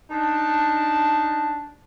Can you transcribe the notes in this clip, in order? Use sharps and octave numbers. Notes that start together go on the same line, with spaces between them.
D4 D#4 A5